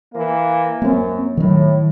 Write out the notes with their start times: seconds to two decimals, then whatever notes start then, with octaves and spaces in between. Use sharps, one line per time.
0.14 E3 A#3
0.82 F#2 A#3 C4
1.37 A2 D#3 F#3